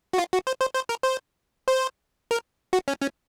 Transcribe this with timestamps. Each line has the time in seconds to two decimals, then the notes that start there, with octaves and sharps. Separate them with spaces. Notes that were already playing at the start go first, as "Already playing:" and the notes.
0.13 F#4
0.18 F4
0.33 F#4
0.47 C5
0.61 C5
0.75 C5
0.89 A#4
1.03 C5
1.68 C5
2.31 A#4
2.73 F#4
2.88 C#4
3.01 C#4